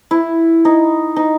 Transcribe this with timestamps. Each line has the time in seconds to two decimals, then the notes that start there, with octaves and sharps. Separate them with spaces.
0.11 E4
0.65 D#4
1.16 D#4